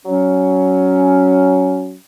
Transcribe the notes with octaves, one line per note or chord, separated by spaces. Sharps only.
F#3 C#4